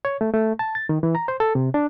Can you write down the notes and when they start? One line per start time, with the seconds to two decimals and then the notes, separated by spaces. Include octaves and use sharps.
0.05 C#5
0.21 A3
0.34 A3
0.59 A5
0.75 A6
0.89 D#3
1.03 E3
1.15 A#5
1.28 C5
1.40 A4
1.55 C3
1.74 D4